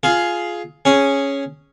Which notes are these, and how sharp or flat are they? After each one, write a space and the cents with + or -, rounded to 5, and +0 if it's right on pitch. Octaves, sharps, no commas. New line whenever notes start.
F4 +0 G#4 +15
C#4 +0 G#4 +0